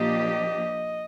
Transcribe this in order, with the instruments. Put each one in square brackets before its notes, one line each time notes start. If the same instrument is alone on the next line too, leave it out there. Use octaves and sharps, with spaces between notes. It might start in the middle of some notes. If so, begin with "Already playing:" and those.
Already playing: [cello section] A#2 F3 A#3 D4 G4 [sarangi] D#5